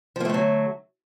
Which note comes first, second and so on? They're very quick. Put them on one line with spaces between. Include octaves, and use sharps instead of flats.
F3 A#3 A3 D3 F#3